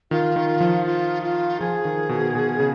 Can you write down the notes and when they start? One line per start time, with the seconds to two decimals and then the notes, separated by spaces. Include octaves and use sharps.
0.11 D#3 F4
0.36 D#3
0.60 F3
0.85 F4
1.23 F4
1.60 F3 G#4
1.85 D#3
2.09 B2
2.35 B2
2.60 C#3